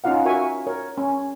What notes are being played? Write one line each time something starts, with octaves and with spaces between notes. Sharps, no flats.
C#4 D#4 F4 F5 F#5
F#4 A#4 E5 G#5 C#6
A#4 C#5
C#4